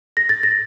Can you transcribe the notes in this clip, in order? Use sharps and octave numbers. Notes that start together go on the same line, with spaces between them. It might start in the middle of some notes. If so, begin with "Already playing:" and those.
A#6
A6
A#6